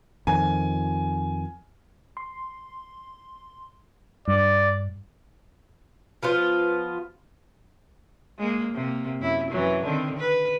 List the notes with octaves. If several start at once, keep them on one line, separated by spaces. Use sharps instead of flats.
F2 D#3 F3 G#5
C6
G2 D5
F3 B3 F4
G#3 A#3
C3 A#3
F#2 E4
F#2 E3 F#3
D3 D#3 C4
B4